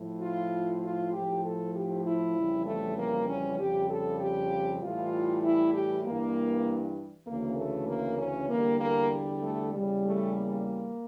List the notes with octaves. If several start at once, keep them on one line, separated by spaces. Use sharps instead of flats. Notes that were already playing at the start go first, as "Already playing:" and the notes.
Already playing: A2 F3
F4
F4
A2 F3 G4
A4
G4
E4
F2 C#3 E3 G3
A3
A#3
C#4
F2 C#3 G3 G4
A4
G4
A2 E3 G3 F4
E4
G4
G2 E3 G3 A#3
D2 C#3 E3 A#3
A3
A#3
C#4
E2 D3 G3 A#3
A#3
A3
E2 C#3 G3
A3
A#3